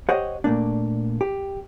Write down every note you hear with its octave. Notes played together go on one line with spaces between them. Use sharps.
G4 C5 C#5 D#5 F#5
A#2 A3 A#3 D4
G4